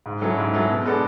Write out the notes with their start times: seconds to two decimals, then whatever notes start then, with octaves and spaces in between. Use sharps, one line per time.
0.06 G#2
0.21 F#3 C#4 E4 A4
0.37 G#2
0.53 F#3 C#4 E4 A4
0.70 B2
0.85 G#3 B3 D4 A4